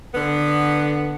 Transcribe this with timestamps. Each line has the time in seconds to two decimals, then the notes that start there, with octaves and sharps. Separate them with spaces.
0.14 D3 B3